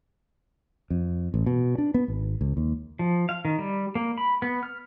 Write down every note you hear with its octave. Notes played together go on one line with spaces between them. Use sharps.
F2
A1
B2
D4
B3
G#1
C#2
D#2
F3
F5
D#3
G3
A#3
B5
B3
F6